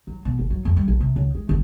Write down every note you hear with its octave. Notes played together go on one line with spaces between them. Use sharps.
F#3
B2
G1
F#3
F2
G3
A#1
C3
C#2
G#3
G1